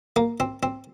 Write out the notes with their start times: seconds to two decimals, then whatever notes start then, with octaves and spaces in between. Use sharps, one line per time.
0.16 A#3
0.40 C4
0.63 C4